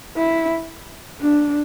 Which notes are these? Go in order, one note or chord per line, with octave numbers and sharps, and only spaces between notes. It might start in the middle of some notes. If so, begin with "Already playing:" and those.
E4
D4